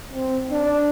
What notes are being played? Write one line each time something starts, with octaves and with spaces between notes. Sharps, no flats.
C4
D4